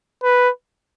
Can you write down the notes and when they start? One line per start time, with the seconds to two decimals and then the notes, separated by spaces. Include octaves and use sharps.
0.23 B4